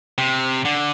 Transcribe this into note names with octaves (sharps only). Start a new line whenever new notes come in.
C3
D3